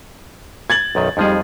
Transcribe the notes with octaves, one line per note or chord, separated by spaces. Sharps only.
G#6 A6 F#7
B1 F#2 D#3
F2 F3 G3 D#4 G#4